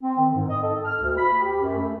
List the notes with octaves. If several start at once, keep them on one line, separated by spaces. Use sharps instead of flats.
C4
D#3
G#2
D#5
A4
F6
D2
B5
G4
F#2
A3